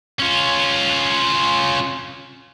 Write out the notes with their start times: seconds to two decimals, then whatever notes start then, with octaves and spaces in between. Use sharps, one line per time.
0.20 C#4 F4